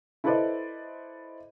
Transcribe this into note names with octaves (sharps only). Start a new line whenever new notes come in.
E4 A4 B4 C5 D5 D#5